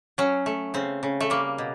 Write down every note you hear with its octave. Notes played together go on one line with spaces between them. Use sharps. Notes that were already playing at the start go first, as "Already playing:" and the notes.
F#3 C#4
A3
C#3 C4
C#3
A3
G3 A#3
B2